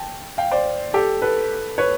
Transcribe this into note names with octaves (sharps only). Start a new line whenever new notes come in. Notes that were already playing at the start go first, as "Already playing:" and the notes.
Already playing: G5 A5
F5 G5
C5 D5
G4 A4
A4 B4
B4 C#5